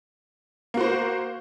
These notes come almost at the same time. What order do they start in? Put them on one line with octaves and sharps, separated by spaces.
A#3 F#4 C5